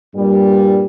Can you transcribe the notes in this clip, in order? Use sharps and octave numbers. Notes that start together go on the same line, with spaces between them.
G2 A#2 G3